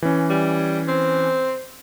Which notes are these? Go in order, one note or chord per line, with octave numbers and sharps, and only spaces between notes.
E3 C#4
G3
C4